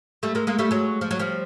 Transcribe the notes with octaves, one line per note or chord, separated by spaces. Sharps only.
G3 A3
G#3 A#3
G#3 A#3
G3 A3
F#3 G#3
F3
F#3
F3 G3